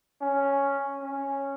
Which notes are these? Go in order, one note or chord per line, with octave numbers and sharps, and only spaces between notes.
C#4
C#4